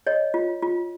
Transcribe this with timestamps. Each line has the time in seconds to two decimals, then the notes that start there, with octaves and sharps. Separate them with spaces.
0.07 C#5 D#5
0.34 F4
0.62 F4